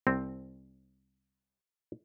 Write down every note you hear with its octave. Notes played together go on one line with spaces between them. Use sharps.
C2 C4